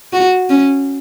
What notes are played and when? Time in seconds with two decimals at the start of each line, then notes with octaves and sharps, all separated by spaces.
0.13 F#4
0.50 C#4